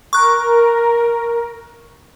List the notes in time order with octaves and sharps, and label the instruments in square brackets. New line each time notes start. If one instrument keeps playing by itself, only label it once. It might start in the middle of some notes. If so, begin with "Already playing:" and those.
[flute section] A#4 [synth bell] C#6 F#6